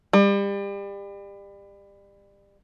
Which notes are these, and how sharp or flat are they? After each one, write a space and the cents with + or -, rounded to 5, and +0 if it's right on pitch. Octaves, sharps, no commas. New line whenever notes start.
G3 +30